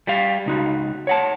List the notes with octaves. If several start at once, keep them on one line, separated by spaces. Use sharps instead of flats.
G3 G4 F5
C#2 D#4 F#4
C#5 F#5 A5